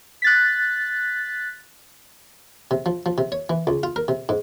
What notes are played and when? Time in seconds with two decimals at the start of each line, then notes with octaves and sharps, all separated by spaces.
0.22 F#6 A6 B6
2.71 C3
2.86 F3
3.06 F3
3.18 C3
3.32 C#5
3.50 E3
3.67 C#2
3.83 F4
3.96 A#4
4.08 C3
4.29 G#2